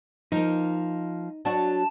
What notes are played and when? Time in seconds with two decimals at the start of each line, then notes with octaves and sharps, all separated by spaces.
0.32 F3 A#3 D#4
1.45 F#3 D4 F#4 A5